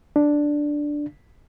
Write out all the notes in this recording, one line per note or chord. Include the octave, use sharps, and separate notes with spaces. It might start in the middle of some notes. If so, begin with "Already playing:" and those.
D4